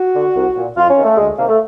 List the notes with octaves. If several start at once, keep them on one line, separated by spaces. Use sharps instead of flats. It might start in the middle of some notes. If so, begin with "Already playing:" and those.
Already playing: F#4
D3
C2
A#2
F2 F4
C#4
C3 D#3
A3
D2 G#3
C3 D#3 A#3
A3